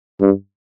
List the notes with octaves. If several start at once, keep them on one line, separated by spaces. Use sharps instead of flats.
G2